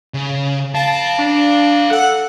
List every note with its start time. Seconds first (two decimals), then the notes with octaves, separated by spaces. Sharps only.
0.14 C#3
0.75 A4 F5 A5
1.19 D4
1.91 A4 F#5